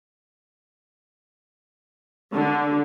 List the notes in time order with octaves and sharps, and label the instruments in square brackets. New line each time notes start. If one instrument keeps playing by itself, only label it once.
[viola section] D3